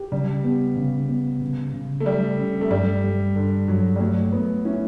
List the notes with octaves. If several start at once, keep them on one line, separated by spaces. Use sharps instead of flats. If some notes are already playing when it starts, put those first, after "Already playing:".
Already playing: G4
C#3 G3
B3
C#3
B3
C#3
C#3
A3
G3 G4
C#4
A3
G2 G3
G3
G2 D3
G2 F#3
G3
F#3 A3
A3 B3
C#4 E4